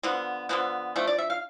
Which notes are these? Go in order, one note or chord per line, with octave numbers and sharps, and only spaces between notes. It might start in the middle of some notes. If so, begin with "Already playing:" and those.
D3 F3 B3
D3 F3 B3
F3 A3 D4
D5
E5
F5